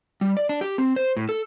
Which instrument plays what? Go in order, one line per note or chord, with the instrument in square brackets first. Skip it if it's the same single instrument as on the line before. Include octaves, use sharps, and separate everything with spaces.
[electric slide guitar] G3
D5
D4
G4
C4
C5
A2
A4